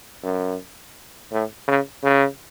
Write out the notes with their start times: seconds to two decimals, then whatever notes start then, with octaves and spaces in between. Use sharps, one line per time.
0.23 F#2
1.32 A2
1.68 C#3
2.03 C#3